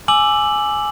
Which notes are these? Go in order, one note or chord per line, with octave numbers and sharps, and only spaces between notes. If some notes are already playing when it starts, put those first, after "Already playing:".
G#5 D6 E6 F#7